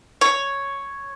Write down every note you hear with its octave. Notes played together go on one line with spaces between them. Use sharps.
C#5